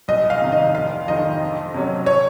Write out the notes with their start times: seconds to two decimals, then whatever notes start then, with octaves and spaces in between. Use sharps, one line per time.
0.08 C2 D#5
0.30 F5
0.42 C3 D#3
0.52 D#5
0.74 F1 F5
1.07 F2 D#3 D#5
1.41 F2
1.74 C3 F#3 C#4
2.06 C#5